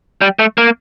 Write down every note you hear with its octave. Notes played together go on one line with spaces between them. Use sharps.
G3
A3
A#3